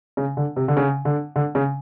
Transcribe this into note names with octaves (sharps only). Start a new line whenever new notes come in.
C#3
D3
C3
D3
C#3
D3
D3
C#3